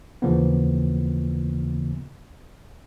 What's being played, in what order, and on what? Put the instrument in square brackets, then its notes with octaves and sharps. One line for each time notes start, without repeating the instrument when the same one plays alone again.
[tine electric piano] D#2 C#3 E3 F3 A#3 B3